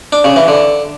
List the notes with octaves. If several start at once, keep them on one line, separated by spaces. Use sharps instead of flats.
D4
C#3
E3
D3